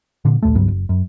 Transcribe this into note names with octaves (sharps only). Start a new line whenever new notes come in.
A#2 D3
A#1 D#2 A3
C#2 G2 F#3 B3
F#1
F#2